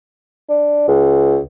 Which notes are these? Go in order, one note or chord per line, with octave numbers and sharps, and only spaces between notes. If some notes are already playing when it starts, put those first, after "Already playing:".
D4
C#2